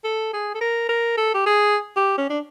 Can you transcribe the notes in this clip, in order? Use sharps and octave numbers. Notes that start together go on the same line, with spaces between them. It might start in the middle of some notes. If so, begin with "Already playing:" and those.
A4
G#4
A4
A#4
A#4
A4
G4
G#4
G4
C#4
D4